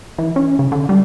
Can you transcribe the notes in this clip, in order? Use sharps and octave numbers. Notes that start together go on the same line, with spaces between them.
E3
C#4
C#3
D3
G3